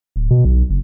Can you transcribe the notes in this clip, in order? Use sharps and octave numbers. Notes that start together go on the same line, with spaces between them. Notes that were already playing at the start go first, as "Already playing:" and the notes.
D1
B2
B1
F#1